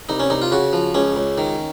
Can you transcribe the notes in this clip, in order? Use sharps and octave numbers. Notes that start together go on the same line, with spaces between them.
C2 D#4
C#4
C2 D#4
F4
C#3 F#4
F3
C#2 C#4
C#2
D#3